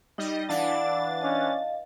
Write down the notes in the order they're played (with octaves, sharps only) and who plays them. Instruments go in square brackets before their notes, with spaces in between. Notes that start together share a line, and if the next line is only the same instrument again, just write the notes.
[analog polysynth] G3 D#5 [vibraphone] D#4
[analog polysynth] E3 D4 A6 [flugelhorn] D5 [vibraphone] F5 F#5
[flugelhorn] C#4 [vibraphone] D#5 F5